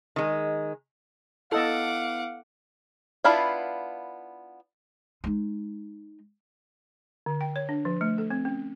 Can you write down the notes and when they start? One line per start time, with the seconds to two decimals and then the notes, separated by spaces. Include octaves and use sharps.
0.16 D#3 G#3
1.52 B3 E4 A4 D#5 F5 F#5 D6
3.24 B3 D4 E4 F4 F5
5.24 G#3 D#4
7.26 D3
7.41 G5
7.56 C#5
7.69 D4
7.85 F3
8.01 A3
8.18 A4
8.30 C4
8.45 C#4